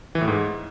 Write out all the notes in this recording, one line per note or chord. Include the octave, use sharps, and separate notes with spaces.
E3
A2
G#2